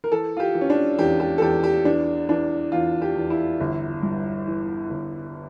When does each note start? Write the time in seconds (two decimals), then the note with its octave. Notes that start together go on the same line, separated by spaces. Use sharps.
0.04 A#4
0.11 E3 A4
0.37 F4
0.40 G4
0.55 E3
0.61 C#4
0.70 D4
0.99 E2 G4
1.20 G4
1.38 A4
1.41 E2 G4
1.64 G4
1.85 E3 D4
2.29 E3 D4
2.72 E2 F4
3.02 G4
3.15 E2
3.30 E4
3.60 G1
4.02 G2
4.47 E3
4.90 G1